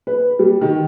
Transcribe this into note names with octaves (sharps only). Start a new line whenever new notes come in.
B4
G3
D#3